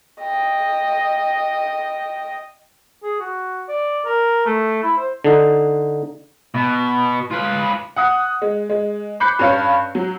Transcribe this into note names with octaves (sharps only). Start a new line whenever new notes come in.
D#5 G5
G#4
F#4
D5
A#4
A3
E4
C5
D3 D#4
B2
F4 B4
F#5 D#6 C#7
G#3
G#3
B5 D6 F#6 G6 C7 C#7
G2 C#4 C#5 F5 C#7
F#3